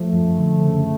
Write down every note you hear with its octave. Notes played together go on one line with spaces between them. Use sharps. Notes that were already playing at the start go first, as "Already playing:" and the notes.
Already playing: F3 A3
F#2
D3
C#3